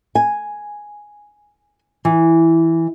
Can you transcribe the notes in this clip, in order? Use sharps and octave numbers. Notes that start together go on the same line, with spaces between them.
G#5
E3